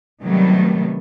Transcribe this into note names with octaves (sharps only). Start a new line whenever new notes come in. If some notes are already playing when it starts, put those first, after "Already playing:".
C3 D#3 F#3 G3 A3 B3